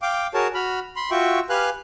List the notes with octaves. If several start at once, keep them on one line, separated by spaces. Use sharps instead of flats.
F5 G5 D6
F#4 G#4 A#4 C#5 A5
F#4 B5 F6
B5 C6
F4 F#4 E5 G5 C#6
G4 B4 F5 G#5 F6 F#6